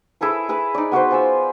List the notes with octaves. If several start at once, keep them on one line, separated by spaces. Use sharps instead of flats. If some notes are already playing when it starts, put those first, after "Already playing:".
E4 G#4 A4 B4
E4 G#4 B4
D#4 D5
B3 F#4 B4 C5
F4 G#5 E6